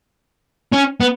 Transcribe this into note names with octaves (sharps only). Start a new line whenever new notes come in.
C#4
B3